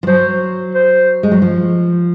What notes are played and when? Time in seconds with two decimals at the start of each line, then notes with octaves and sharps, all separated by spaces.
0.03 F3
0.07 F#3 C5
0.75 C5
1.23 G#3
1.32 F#3
1.42 F3